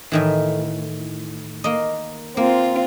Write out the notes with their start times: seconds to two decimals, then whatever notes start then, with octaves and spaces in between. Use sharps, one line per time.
0.12 A2 D#3 E3
1.64 A#3 D#5
2.37 A#3 C4 F4